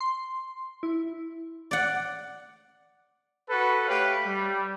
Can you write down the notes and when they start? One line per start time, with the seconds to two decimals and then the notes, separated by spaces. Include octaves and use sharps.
0.01 C6
0.83 E4
1.71 D5 F#5
3.49 F#4 A4 B4
3.88 A3 G4 B4 C#5 F5
4.26 G3